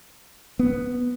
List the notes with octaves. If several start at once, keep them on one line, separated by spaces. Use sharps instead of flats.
B3